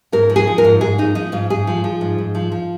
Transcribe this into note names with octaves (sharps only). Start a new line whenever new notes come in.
G#2 A#4
F3
G#4
F3
A#4
G#2
G#2 G#4
F3 D#4
F3 D#4
G#2 F4
G#2 G#4
F3
F3
G#2
G#2
F3
F3